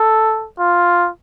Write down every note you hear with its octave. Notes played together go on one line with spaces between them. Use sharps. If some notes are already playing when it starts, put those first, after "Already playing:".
Already playing: A4
F4